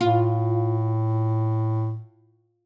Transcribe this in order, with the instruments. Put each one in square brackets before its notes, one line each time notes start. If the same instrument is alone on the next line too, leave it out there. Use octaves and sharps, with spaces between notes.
[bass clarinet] A2 [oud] F4